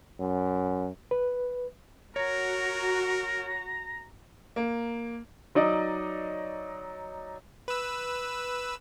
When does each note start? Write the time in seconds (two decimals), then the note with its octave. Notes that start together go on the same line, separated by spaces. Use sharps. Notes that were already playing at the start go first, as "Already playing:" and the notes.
0.20 F#2
1.11 B4
2.16 F#4 A#4 C#5 A#5
4.56 A#3
5.55 F#3 D#4 D5 D#5
7.68 B4 E6